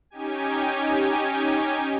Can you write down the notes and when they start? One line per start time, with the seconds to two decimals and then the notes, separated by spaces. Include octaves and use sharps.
0.10 C#4 D#4 G4 G#5